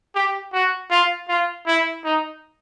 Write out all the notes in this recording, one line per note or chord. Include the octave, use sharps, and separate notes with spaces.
G4
F#4
F4
F4
E4
D#4